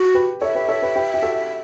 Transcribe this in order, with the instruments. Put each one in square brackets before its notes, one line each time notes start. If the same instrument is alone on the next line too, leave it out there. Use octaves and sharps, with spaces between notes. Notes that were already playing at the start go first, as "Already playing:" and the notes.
Already playing: [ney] F#4
[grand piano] G4 B4
[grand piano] A4 C#5 [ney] E5
[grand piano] G4 B4
A4 C#5
G4 B4
G4 B4
G4
F#4 A4